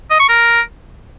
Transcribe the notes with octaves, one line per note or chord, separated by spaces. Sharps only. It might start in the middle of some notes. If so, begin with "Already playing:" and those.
D#5
C#6
A#4